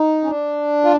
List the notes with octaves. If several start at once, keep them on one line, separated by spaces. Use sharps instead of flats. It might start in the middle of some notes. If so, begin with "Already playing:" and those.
Already playing: D#4
C#4
D4
F4